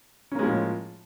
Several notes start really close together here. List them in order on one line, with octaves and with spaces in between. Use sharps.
C#4 A#3 G#3 F3 A2